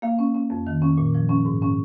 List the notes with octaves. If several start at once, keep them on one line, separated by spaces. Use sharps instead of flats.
A#3 F5
C#4
C#4
F2
D#3
C#4
A#2
F3
C#4
G#2
C#4